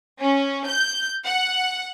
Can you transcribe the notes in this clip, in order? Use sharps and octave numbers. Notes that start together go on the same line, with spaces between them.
C#4
G6
F#5